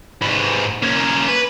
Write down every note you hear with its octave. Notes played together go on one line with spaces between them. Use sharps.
G#2 B4
A#3 C#4
B4